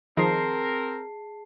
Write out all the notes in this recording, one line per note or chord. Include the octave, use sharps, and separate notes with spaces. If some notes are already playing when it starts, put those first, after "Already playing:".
D#3 F3 C4 G#4 A#4 A5 C7